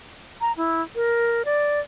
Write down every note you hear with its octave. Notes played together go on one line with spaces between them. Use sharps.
A#5
E4
A#4
D5